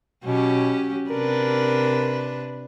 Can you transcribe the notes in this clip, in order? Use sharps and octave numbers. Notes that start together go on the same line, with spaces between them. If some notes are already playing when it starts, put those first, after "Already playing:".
B2 F#3 C#4 G4
C3 D4 A#4 B4